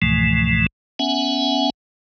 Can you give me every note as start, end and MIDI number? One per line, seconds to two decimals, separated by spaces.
0.02 0.66 37
0.02 0.66 44
0.02 0.66 47
0.02 0.66 52
0.02 0.66 53
0.02 0.66 57
0.99 1.70 59
0.99 1.70 61
0.99 1.70 76
0.99 1.70 78
0.99 1.70 80